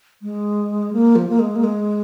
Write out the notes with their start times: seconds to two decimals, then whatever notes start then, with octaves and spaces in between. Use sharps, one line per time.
0.22 G#3
0.93 A#3
1.16 F3
1.29 A#3
1.39 G#3
1.56 A#3
1.64 G#3